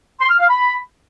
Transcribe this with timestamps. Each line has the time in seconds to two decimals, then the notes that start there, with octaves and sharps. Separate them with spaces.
0.20 C6
0.30 F6
0.40 F5
0.49 B5